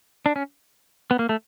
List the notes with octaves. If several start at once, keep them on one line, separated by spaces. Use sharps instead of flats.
D4
C#4
B3
A#3
A3